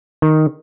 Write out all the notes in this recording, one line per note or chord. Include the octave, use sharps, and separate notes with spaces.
D#3